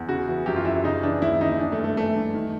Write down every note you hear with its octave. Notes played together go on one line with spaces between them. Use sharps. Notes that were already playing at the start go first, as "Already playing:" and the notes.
Already playing: E2
C#3 F#4
E3
F#2 G4
F4
F#2 E4
C#3 D#4
E3 D4
D#2 E4
D#2 D#4
E3 D4
A3
G2
A3
E3 A3
G2
D#3